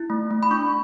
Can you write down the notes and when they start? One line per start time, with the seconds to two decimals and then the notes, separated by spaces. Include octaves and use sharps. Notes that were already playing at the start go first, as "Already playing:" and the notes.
Already playing: E4
0.10 A3
0.31 A3
0.43 B5
0.51 D4 C#6